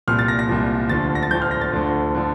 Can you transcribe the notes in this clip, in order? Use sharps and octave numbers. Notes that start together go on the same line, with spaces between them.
C2 A#2 F3 F6
A6
A#6
A#6
C2 A#2 F3
D2 D3 F3 A6
A#6
A6
D2 D3 F3 G6
F6
A#6
A6
D2 D3 F3
D3 F3